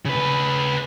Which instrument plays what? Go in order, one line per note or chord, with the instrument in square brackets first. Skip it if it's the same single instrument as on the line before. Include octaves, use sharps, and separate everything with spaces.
[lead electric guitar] C#3 B4